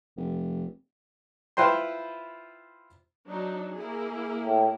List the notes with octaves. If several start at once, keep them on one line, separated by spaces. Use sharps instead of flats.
F1
E4 F4 B4 C5 G5 C6
F#3 D4 D#4
A#3 E4 G#4
A2